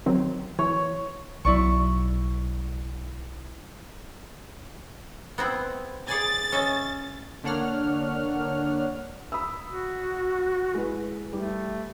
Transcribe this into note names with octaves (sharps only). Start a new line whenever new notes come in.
D#3 F#3 C4
E3 C#5
B1 F#3 E4 D5 C#6
B3 C4 E4
G#4 D5 G#5 A6
C#4 D#5 E5
D3 A#3 D4 C#5 F#5 F6
B5 D#6 E6
F#4
G#3 E4 B4
G3 A3